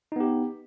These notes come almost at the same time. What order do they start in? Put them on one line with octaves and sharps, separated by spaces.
D#4 B3 G4